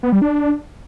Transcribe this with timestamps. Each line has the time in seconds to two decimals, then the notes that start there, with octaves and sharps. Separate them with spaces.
0.03 B3
0.12 G3
0.22 D4